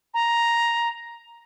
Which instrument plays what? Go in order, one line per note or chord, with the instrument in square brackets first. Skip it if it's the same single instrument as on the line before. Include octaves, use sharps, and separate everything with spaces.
[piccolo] A#5